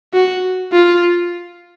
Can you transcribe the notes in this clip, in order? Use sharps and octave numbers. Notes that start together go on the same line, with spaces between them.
F#4
F4